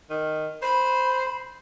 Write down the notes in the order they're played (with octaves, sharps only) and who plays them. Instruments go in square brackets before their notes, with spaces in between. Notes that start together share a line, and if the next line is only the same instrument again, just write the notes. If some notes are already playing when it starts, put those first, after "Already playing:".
[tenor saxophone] D#3
[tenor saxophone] C5 [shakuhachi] B5